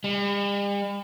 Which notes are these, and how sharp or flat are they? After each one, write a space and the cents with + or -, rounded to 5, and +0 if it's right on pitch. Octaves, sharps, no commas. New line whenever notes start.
G3 +45